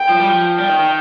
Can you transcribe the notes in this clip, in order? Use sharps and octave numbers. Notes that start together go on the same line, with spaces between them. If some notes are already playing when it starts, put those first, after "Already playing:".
Already playing: G5
F3
G3
F3
G3 G5
D#3
D#3